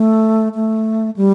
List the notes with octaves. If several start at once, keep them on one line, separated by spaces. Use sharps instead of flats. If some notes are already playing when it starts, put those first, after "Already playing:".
Already playing: A3
A3
G3